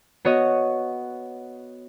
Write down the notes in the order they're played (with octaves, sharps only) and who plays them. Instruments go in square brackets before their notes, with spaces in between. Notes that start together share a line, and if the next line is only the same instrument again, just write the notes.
[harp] B3 F#4 C#5 D#5